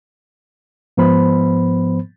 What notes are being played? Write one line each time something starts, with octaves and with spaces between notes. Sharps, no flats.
G#2 F3 B3 C5 B5